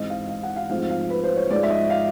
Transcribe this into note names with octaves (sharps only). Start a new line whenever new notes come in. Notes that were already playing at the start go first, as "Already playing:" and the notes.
Already playing: G#2 E3 G#3 C4 D#5
F5
F5
F#5
F5
G#2 F3 A3 C4 F5
F5
B4
C5
C#5
G#2 F3 G#3 D5
E5
D#5
F5